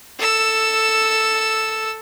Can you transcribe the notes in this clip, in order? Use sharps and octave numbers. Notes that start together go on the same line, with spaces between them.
A4 E6